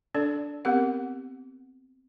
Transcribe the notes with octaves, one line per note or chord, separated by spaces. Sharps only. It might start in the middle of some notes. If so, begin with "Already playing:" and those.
D4 A4 D5
B3 C4 G4 A#4 F#5